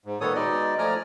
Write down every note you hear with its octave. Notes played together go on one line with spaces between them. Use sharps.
G#2
A#2 D#3 B3 A4 C#5 D#6
B2 G#3 D#4 D5 D#5
F3 A3 D5 G#5 A#5 F6